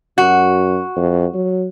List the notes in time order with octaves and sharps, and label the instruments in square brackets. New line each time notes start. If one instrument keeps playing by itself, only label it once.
[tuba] F#2 [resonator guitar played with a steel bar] F#4
[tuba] F2
F#3